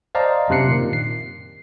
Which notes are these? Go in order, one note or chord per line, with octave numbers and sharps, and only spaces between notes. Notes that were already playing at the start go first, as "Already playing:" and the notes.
C5 D5 D#5 F5 A5 A#5
F#2 C3 D4 F#6 C7 C#7
A#2 D#3
C7